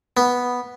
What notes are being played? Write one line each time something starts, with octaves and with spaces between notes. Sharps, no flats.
B3